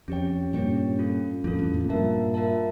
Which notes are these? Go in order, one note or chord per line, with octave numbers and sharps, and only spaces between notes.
F2 C#4 G4 C#5 G5
G2 A#2 C#4 G4 C#5 G5
C#4 F4 A4
F2 A2 C#4 F4 A4
E2 G2
F2 A2
C#3
G2 A#2 F4 A#4 E5 A5
F4 A#4 E5 A5